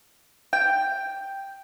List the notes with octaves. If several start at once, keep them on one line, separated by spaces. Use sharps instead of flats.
G5